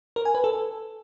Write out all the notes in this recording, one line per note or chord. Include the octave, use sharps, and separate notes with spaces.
A#4
G#5
B4
A4